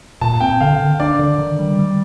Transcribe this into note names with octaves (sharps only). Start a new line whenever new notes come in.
A#2 A5
C4 G5
D3 F5
D3
D4 D5
D3
D#3
G3
G3